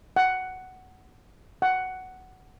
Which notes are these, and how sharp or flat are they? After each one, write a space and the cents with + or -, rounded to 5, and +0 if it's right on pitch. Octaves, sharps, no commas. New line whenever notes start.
F#5 +10
F#5 +10